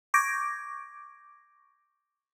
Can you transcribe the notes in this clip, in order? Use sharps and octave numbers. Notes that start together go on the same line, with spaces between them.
C#6 D6 G6 G#6 A#6 D7